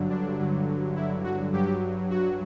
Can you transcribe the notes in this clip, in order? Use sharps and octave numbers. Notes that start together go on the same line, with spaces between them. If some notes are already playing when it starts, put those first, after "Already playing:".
Already playing: G2 D3 F#3
D4
G2 D3 F#3
E4
F#4
G2 F#3 G4
F#4